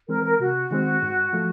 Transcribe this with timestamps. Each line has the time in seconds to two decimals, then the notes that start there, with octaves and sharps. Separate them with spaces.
0.08 E3 G#3 C4 A#4
0.24 A#4
0.39 C3 F#4
0.71 D#3 G#3 C4
1.02 G#2
1.33 F3 A3